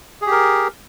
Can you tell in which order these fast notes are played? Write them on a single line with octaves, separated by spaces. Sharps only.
G#4 G4 A#4